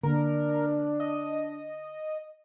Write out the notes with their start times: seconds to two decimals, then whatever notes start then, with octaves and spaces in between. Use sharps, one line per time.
0.03 D3 A#3 D4 A#4
1.00 D#5